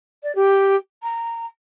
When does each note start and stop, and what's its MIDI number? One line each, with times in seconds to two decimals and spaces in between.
0.23 0.34 74
0.35 0.76 67
1.03 1.46 82